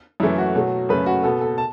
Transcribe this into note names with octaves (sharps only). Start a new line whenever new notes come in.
F#2 E3 A3 E4
F#4
B2 F#3 A3
F#2 C#3 A3 B4
F#4
B2 B3 A4
A4
A5